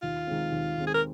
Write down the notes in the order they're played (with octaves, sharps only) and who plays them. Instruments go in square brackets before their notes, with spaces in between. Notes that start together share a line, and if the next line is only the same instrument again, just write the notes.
[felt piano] D#2 [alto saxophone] F4
[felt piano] D#3 G#3 C4
D#2
D#3 G#3 C4
[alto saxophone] G#4
A#4